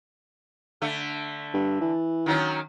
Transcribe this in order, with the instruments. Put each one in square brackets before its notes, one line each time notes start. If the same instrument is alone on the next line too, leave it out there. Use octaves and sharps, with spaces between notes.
[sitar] D3 A3
[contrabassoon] G2
E3
[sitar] D#3 F#3 C#4